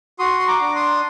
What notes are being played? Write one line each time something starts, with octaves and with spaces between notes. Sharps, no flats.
F#4 C6 D#6
C6
A#5 D6
D4
C6 D#6